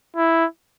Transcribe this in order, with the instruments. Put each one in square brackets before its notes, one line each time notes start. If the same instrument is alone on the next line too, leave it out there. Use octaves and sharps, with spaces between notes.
[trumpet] E4